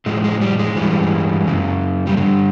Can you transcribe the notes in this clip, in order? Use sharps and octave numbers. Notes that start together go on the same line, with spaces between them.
A2 F3 G#3
G#3
G3
G#3
G2 E3 G3
F#2 C#3 F#3
G3
G2 D3 G3 G#3